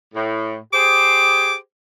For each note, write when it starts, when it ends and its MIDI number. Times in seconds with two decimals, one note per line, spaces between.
0.14 0.56 45
0.73 1.56 67
0.73 1.56 68
0.73 1.56 72
0.73 1.55 86